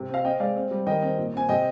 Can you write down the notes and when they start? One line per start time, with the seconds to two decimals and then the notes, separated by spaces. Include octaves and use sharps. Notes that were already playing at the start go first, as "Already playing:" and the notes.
Already playing: C3
0.09 C4 F5
0.24 C4 D#5 G5
0.40 G#3 D5 F5
0.56 C4
0.71 G3
0.87 D#3 D#5 G5
1.02 C4
1.18 A#2
1.33 C4 G#5
1.49 C3 D#5 G5